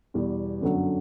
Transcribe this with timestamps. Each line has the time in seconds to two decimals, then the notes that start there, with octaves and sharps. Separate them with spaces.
0.14 E2 B2 G3
0.61 G1 F#2 D3 F#3